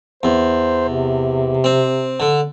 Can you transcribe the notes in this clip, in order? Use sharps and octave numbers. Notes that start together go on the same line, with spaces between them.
E2 C5
C3
C4
D3